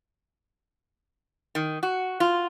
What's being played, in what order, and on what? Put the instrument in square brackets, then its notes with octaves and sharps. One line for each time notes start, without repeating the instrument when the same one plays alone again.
[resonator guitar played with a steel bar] D#3
F#4
F4